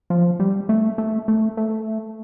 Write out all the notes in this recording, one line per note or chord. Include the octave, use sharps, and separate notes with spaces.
F3
G3
A3
A3
A3
A3